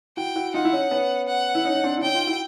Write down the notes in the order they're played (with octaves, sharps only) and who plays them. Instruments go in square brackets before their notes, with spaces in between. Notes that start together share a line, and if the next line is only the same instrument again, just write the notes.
[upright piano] E4 F#4 [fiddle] G5
[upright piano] E4 F#4
[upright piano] D#4 F4 [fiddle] F#5
[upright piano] E4
C#4 D#4
B3 C#4
[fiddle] F#5
[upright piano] E4
C#4 D#4
D#4
C4 D4
E4
[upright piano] C#4 D#4 [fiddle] G5
[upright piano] D#4 F4
E4 F#4